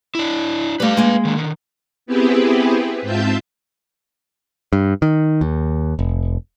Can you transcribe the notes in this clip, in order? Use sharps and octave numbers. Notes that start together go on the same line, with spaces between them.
D4 E4
G3 A3 B4 F5
G#3 A#3
D3 D#3
B3 C4 E4 G4 G#4 B4
G#2 C4 F4 E5 A5 G6
G2
D#3
D#2
F1